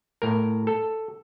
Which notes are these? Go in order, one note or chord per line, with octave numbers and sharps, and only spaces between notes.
A2 A#4
A4